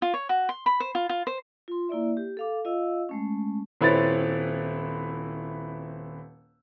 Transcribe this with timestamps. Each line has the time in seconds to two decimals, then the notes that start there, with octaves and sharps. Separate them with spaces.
0.02 F4
0.14 C#5
0.29 F#4
0.49 C6
0.66 B5
0.80 C5
0.95 F4
1.09 F4
1.27 C5
1.68 F4 C6
1.89 A#3 E4 D5 E5
2.17 G4
2.37 A4 F5 D6
2.65 F4 D#5 F5 E6
3.09 G#3 A3 C#4
3.81 D#1 C4 E4 B4 C#5 A6